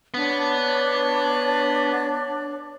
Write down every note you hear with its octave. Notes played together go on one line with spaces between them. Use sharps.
B3 D4 C#5